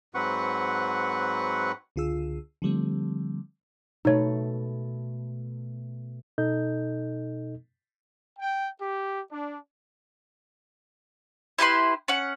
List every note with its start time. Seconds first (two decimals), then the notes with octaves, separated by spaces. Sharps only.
0.15 G#2 F#3 C4 B4 F#5 C#6
1.96 C#2 D3 F4 G#4 E6
2.62 D3 F3 G3 A3 C4
4.05 B2 A3 D#4 C#5
6.38 B2 D#4 A4 D#5 G6
8.39 G5
8.81 G4
9.31 D4
11.59 E4 G4 B4 C6
12.08 C#4 F#5